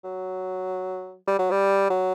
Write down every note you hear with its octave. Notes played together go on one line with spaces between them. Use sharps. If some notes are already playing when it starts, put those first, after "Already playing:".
F#3
G3
F#3
G3
F#3